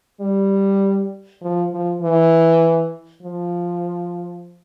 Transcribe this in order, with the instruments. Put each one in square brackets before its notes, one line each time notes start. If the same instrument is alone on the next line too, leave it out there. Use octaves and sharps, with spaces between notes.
[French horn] G3
F3
F3
E3
F3